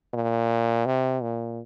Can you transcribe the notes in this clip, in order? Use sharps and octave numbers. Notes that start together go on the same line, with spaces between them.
A#2
C3
A#2